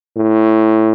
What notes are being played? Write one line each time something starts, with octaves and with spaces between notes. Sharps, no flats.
A2